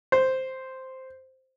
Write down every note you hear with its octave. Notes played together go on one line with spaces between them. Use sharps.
C5